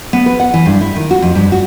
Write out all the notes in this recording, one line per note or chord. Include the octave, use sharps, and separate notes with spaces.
B3
B4
F#5
E3
G2
E4
D#3
F#4
F2
G2
F#4